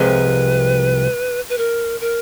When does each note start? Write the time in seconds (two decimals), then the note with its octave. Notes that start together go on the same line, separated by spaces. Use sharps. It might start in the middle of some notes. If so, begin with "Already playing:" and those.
Already playing: C2 C3 F3 G#3 B4
1.49 B4
1.58 A#4
2.01 A#4